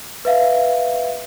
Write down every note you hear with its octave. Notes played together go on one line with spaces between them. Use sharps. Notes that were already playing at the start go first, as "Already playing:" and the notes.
B4 E5 F5